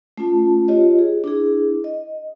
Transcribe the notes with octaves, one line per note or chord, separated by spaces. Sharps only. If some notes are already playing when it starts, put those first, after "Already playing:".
A3 C#4 F4 A5
F4 G4 C#5 D#5
G#4
D4 E4 G#4
D#5